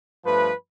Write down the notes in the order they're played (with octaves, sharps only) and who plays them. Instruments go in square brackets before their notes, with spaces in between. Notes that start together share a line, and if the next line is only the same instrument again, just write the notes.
[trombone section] G2 F3 A3 B4